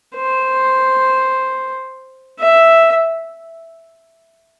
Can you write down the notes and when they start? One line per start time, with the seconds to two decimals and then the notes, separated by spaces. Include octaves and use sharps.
0.16 C5
2.39 E5